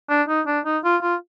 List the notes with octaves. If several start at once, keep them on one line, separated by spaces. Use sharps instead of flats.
D4
D#4
D4
D#4
F4
F4